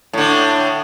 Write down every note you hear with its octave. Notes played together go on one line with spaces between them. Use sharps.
A2 D3